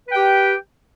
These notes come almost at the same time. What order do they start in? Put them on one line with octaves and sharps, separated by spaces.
B4 G5 G4